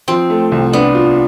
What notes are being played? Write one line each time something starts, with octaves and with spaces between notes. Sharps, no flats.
F3 C4
A3
C2
B3 D4
F4